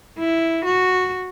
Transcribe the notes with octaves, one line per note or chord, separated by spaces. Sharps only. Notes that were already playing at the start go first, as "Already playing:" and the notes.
E4
F#4